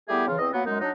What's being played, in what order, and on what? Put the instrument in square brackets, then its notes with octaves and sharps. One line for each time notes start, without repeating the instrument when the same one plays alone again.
[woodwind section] G3 A3 B3 E4 G4 G#4
C#3 E3 F4
E2 C4 D#5
F#3 A#3 B3
F#2 G#3 D#4
F#3 D4 D#4